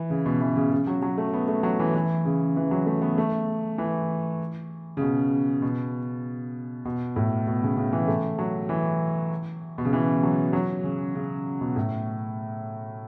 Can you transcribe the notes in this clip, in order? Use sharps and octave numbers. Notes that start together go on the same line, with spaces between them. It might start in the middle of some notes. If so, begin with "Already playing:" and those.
Already playing: E3
C#3
B2
E3
C#3
C#3
F#3
F#3
A3
B3
A3
F#3
E3
E3
C#3
E3
F#3
A3
B3
A3
E3
C#3
B2
B2
B2
A2
B2
C#3
C#3
E3
A3
F#3
E3
B2
C#3
E3
F#3
F#3
C#3
C#3
B2
A2